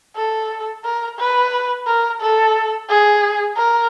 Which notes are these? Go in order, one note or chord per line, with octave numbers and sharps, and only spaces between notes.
A4
A#4
B4
A#4
A4
G#4
A#4